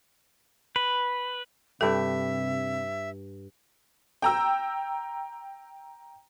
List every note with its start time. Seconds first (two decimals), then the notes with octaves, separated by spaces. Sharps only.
0.76 B4
1.81 G2 C3 G4 A4 E5
4.22 G5 A#5 E6